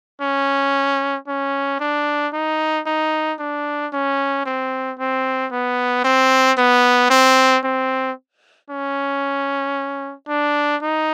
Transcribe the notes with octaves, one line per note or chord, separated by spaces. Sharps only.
C#4
C#4
D4
D#4
D#4
D4
C#4
C4
C4
B3
C4
B3
C4
C4
C#4
D4
D#4